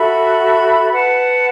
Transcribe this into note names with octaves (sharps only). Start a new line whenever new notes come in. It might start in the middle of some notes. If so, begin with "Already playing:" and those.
Already playing: F#4 A4 E5 B5
B4 F#5 A5